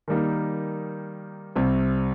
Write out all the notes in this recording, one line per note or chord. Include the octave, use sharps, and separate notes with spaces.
D#3 G3 A#3 D#4
C2 C3 G3 C4